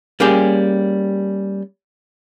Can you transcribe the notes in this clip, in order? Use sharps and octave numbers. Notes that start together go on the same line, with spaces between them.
G3 A#3 C#4 G4 G#4